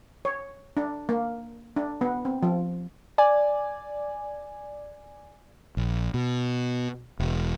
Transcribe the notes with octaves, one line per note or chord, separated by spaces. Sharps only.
C#5
D4
A#3
D4
B3
C4
F3
D5 G#5
A#1
B2
E1